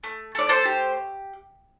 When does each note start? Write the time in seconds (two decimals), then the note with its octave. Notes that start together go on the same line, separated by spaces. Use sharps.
0.04 A3
0.35 A3 D5
0.49 A4 C5
0.65 G4